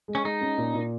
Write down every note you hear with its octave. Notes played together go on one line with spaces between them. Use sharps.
G#3
C#4
G#3 D#4
C#4
A#2
A#2